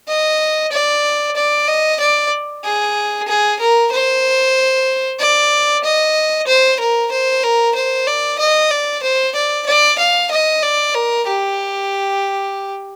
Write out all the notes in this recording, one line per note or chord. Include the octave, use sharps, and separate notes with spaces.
D#5
D5
D5
D#5
D5
G#4
G#4
A#4
C5
D5
D#5
C5
A#4
C5
A#4
C5
D5
D#5
D5
C5
D5
D5
F5
D#5
D5
A#4
G4